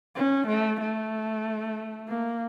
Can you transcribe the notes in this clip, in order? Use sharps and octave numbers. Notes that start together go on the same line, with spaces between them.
C#4
A3
A3
A#3